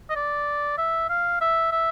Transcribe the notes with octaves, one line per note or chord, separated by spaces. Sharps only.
D#5
D5
E5
F5
E5
E5